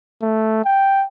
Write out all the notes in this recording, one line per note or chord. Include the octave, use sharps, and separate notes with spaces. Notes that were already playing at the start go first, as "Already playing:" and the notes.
A3
G5